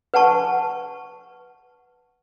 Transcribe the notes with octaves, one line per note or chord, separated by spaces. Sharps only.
B4 F#5 G#5 A5 C#6